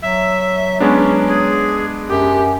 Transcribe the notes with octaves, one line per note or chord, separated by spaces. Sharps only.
F#3 E5
G#3 B3 C#4 D4
G#4
F#2 G4